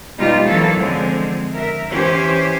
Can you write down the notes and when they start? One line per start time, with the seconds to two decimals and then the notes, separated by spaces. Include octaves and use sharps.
0.17 B2 G3 G#3 D#4 F4 G4
0.46 E3 F#3 A#3 C#4 A4
0.77 D3 F3 G#3 C4
1.53 A#4 E5
1.89 E3 C#4 G4 C5